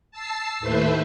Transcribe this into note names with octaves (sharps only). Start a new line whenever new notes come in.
A5 E6 C7
D#2 A2 A3 B4 C5 E5